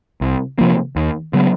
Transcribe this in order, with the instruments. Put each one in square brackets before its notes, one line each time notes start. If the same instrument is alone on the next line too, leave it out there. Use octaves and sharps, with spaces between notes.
[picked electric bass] C2
C3 F3 A#3
D#2
C#3 F#3 B3